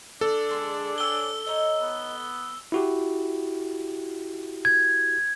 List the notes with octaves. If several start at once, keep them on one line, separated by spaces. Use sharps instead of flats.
D4 A4
D3 G#3 G#4
C#5 G5 G#5 E6 G7
D#4 C#5 D#5
B3
E4 F#4 G4
G#6